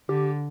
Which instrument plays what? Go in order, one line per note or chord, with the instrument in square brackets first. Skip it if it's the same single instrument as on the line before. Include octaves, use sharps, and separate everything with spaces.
[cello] D3 [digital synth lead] G4